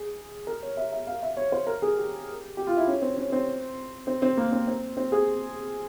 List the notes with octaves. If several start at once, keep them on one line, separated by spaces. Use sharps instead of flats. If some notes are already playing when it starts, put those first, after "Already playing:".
Already playing: G#4
A#4
C#5
E5
E5
F5
E5
C#5
C5
A#4
G#4
G4
G4
F4
E4
C#4
C4
C#4
C4
C4
C4
A#3
C4
C4
C4
G#4